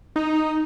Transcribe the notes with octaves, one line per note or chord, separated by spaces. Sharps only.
D#4